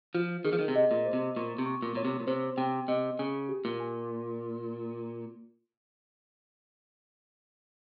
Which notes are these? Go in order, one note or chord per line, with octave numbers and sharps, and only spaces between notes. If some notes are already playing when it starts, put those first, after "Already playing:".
F3 F4
D#3 G#4
F3
D#3
C3
D#5
A#2
C5
C3
A#2 C#6
C3
C#6
A#2
A#2 C#5
C3
A#2
C3 C5
C3 G5
C3 D#5
C#3 G#5
G4
A#2
G#5